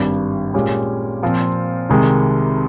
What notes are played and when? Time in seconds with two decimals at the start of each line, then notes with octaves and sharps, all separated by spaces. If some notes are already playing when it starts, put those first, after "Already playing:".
Already playing: G#1 G2 G3
0.54 A#2 G#3 C#4 G4
1.22 A#2 F3 C4 F4
1.89 C2 C3 D#3 G#3